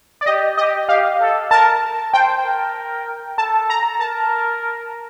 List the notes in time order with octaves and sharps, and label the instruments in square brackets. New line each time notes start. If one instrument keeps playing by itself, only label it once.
[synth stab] D5
[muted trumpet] G4 [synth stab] D#5
[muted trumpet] G4 [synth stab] D#5
[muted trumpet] G4 [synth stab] F5
[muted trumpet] A4
[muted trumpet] A#4 [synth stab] A5
[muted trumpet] C5 [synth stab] G5
[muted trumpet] A#4
[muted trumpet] A4 [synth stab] A5
[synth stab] A#5
[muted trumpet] A#4 [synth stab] A5